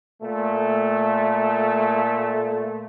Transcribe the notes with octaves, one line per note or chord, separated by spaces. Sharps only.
A#2 A3